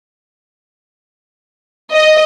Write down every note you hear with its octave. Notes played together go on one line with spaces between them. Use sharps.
D#5